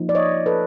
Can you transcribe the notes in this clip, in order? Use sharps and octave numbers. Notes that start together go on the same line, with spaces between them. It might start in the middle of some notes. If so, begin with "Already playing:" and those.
Already playing: F3 A#3 D#4
D5
C#5 D#5
A4 B4